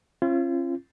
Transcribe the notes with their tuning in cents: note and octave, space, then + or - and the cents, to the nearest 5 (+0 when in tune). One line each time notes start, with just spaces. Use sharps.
C#4 -45 F4 -35